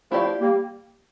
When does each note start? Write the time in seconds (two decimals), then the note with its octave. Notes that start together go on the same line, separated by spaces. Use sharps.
0.11 F3 A3 E4 G4 D5 F5
0.41 G3 A#3